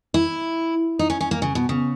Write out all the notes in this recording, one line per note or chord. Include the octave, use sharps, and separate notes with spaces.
E4
D#4
C#4
C#4
A#3
C#3
B2
C#3